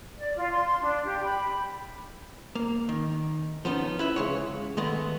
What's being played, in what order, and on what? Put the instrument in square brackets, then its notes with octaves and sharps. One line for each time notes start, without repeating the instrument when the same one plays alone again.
[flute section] D5
F4
C6
C6
D4
G4
B5
[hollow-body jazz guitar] A#3
D#3
F3 B3 C#4 D#4
E4 B4 E5
C#3 G#3 C#5
D#3 G#3 A3 B3